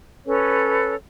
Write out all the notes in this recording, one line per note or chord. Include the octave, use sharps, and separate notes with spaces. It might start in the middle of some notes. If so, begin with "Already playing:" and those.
C#4 A4 B4 C#5